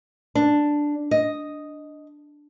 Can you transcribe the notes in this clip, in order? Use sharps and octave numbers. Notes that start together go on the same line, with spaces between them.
D4
D#5